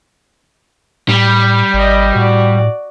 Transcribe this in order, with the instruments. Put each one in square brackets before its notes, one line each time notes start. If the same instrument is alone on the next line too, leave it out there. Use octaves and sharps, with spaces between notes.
[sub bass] A2 [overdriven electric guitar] G3
[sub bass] G#1 [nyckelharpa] D5 D#5
[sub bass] A2 [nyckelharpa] F#4 D5